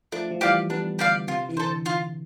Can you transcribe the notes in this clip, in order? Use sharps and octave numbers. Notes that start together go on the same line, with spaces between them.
F3 A3 D4
F3
E3 G3 G4 D5 F5
G3 B3 D4
D3 G4 D5 F5
C3 F4
E3
D3 A4 C5
F4